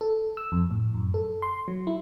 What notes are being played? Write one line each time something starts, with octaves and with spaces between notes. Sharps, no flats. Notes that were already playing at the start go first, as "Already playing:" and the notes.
A4
E6
F2
A2
F#2
A4
C6
F#3
E4